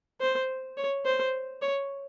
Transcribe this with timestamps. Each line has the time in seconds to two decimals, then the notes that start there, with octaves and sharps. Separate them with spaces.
0.21 C5
0.78 C#5
1.06 C5
1.62 C#5